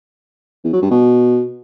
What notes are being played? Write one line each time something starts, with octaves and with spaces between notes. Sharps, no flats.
E2
F#3
G2
B2